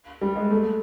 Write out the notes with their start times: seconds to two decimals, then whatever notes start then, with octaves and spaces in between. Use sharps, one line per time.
0.21 G3
0.36 G#3
0.50 A3